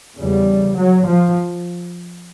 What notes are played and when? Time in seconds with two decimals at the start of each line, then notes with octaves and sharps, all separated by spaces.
0.19 E2 C#3 G3
0.76 F#3
1.05 F3